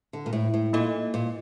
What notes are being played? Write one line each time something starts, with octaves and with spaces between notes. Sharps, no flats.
D3
A#2
A2
A2
A#2 A#3 D#4 A4 D#5
A#2